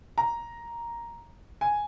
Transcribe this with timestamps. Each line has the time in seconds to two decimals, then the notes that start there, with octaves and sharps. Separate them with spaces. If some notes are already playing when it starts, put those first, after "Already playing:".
0.18 A#5
1.61 G#5